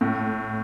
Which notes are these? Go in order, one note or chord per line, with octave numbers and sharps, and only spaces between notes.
A2